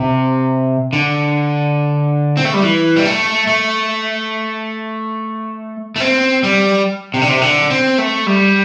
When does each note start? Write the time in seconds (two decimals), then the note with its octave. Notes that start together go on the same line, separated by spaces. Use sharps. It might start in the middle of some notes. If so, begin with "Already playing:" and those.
Already playing: C3
0.93 D3
2.37 C4
2.45 A3
2.54 G3
2.62 E3
2.96 G3
3.05 A3
3.47 A3
5.96 A3
6.00 C4
6.43 G3
7.14 C3
7.22 D3
7.29 C3
7.41 D3
7.70 C4
7.98 A3
8.27 G3